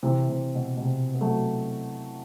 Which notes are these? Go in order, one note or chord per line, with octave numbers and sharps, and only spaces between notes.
C3 E3
C3
B2
B2
C3
B3
F#3 A3